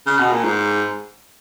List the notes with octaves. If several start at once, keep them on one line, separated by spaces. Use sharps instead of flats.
C#3
B2
A#2
G#2